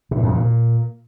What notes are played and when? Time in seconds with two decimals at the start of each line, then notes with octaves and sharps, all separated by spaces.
0.11 B2
0.17 A2
0.23 F2
0.29 C#3
0.34 A#2